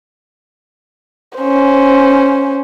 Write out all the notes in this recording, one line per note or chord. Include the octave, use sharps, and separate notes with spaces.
C#4 C5